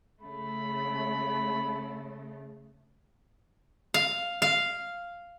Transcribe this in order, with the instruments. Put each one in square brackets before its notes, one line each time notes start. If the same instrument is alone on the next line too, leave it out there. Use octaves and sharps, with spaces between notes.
[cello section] C#3 A3 [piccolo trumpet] B5
[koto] F5
F5